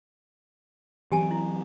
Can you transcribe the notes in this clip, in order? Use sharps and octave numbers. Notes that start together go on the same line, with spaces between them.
E3 F#3 C4 G4 G#5 A5
E4